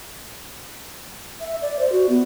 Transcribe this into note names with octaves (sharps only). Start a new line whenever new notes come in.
E5
D5
C5
F#4
B3